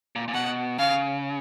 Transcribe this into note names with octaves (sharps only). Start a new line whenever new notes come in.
A#2
A#2
B2 F#5
C#3 F5